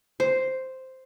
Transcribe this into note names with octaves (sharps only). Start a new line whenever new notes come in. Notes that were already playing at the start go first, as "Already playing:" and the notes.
C5